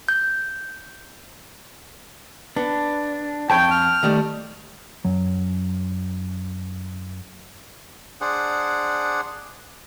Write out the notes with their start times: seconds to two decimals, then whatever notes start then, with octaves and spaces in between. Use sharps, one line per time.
0.09 G6
2.56 B3 D4
3.50 F2 C#5 G5 A5 B5 G6
3.71 F6
4.03 D#3 G3 A3
5.05 F#2 F#3
8.21 D4 G#4 C5 F#5